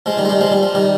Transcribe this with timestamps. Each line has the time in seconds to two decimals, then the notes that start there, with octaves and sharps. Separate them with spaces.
0.06 F3 G#3
0.17 D#3 G3
0.25 G#3
0.29 D#3 G3
0.41 F3 G#3
0.52 G3
0.63 F3
0.75 D#3 G3